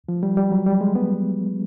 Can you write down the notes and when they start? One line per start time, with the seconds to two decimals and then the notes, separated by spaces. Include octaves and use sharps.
0.08 F3
0.23 G3
0.37 G3
0.52 F#3
0.66 G3
0.81 G#3
0.95 B3